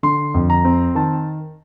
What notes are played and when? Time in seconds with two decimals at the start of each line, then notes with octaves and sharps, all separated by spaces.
0.03 D3 C6
0.34 F2
0.50 A#5
0.65 C4
0.95 D#3 A5